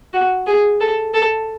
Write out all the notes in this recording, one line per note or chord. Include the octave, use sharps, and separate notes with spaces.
F#4
G#4
A4
A4